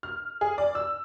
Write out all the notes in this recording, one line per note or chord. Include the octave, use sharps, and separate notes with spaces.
F6
G#4
D5
E6